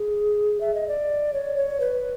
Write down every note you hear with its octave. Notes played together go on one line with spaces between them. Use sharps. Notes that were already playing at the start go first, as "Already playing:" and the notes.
Already playing: G#4
E5
D#5
D5
C#5
C#5
B4